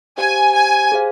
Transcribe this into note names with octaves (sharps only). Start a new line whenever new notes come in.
G4 C5 F5 G#5
G#5
G#4 C5 F5